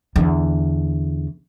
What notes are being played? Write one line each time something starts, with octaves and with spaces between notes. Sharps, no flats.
E2 D3